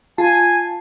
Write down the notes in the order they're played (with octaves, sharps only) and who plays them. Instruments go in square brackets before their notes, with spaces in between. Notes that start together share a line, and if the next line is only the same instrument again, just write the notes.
[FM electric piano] F4 A5 [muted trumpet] G#5